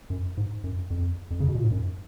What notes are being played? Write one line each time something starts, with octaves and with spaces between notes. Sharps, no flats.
F#2
G#2
F#2
F2
F2
C#3
B2
A#2
G#2
F#2